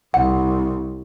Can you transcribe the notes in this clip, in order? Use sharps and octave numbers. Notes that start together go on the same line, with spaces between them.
C2 F#5